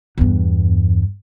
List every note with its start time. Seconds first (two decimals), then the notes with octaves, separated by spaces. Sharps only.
0.18 E2 G2